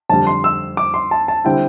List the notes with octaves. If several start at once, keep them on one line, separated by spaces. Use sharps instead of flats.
F2 D3 G3 A5
C6
E6
D6
C6
A5
A5
D3 G3 C4 E4 G5